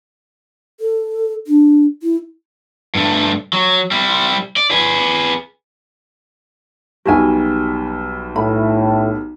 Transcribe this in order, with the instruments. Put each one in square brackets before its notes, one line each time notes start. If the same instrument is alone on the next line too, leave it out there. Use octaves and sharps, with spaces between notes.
[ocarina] A4
D4
E4
[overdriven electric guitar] G2 A3
F#3
G3 E4
D5
G#4 B4
[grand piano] B1 G3 [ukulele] F#4 G#4 G#5
[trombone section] A2 [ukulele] B5